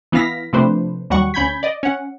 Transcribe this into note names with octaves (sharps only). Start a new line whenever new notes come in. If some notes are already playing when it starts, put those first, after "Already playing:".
E3 B3 E4 F5 A#6 B6
C3 F3 A3 D4 B4 C5
D#2 F#3 G3 F#5 C#6
D2 C#4 B5 G6 G#6 B6
D5 D#5
C#4 F#5